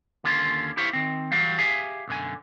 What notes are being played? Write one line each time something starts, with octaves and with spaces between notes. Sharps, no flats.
D#2 D3 C#4 F4 C6
E4 G4 C5 C#5 E5 F5
D#3 C4
E3 F#3 G3 F5
G4 G#4 E5 F5 G#5
B1 F#2 D3 G#5